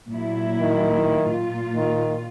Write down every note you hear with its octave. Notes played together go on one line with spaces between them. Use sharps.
A#2 F#3 E4
D#3
A#2 F4
D#3